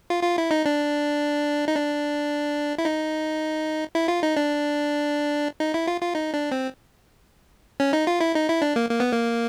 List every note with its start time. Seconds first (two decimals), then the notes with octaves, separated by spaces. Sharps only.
0.10 F4
0.23 F4
0.38 E4
0.51 D#4
0.66 D4
1.68 D#4
1.75 D4
2.78 E4
2.85 D#4
3.95 E4
4.08 F4
4.23 D#4
4.37 D4
5.60 D#4
5.74 E4
5.87 F4
6.01 F4
6.15 D#4
6.34 D4
6.52 C4
7.80 C#4
7.93 D#4
8.07 F4
8.20 E4
8.35 D#4
8.49 E4
8.62 D4
8.76 A#3
8.90 A#3
9.00 B3
9.12 A#3